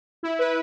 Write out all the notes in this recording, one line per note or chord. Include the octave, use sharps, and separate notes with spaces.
E4
B4